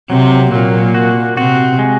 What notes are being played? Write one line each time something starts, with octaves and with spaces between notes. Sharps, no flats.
C3 F#3 C4
A#2 F#3 A#3
F#4
C3 C4 F#4
G#3